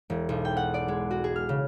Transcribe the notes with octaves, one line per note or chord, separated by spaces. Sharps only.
E1
B1
G5
F#5
D5
G#3
F#4
G#4
F6
C#3